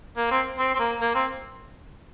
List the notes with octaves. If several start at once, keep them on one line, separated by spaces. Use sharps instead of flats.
A#3
C4
C4
C4
A#3
A#3
C4